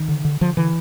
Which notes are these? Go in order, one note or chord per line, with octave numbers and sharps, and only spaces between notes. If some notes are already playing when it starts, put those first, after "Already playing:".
Already playing: D#3
D3
D3
D3 F3
D3 E3